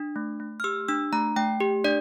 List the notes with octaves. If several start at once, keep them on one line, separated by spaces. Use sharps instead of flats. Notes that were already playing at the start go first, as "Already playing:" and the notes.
Already playing: D4
A3
A3
F6
G4 E6
D4 E6
A3 A#5
A3 G5
G4
D4 D5